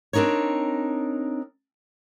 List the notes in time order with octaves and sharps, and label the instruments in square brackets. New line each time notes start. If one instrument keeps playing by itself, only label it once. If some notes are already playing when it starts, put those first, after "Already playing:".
[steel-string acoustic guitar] C4 D4 D#4 A#4 C#5